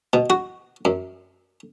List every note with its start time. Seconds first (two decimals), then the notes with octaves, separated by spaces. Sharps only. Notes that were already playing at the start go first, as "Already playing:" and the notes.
0.13 B2
0.30 F#4
0.85 F#2